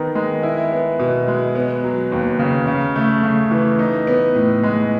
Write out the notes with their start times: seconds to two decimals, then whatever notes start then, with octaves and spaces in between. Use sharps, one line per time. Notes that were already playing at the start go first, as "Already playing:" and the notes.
Already playing: D#3 B3 D#4
0.15 G#3
0.43 E4
0.72 B3
0.99 B2
1.28 G#3
1.55 B3
1.84 F#3
2.12 D#2
2.39 C#3
2.67 C#3
2.96 A3
3.23 C#3
3.51 E3
3.79 D#4
4.07 B3
4.35 A2
4.63 G#3